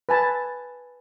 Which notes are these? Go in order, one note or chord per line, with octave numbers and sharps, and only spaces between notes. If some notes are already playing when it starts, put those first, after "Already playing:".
B4 G#5 A5 B5